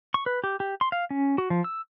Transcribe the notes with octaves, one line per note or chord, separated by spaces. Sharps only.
C#6
B4
G4
G4
C6
F5
C#4
F#4
F3
E6